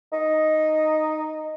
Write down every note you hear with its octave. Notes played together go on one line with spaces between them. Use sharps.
D#4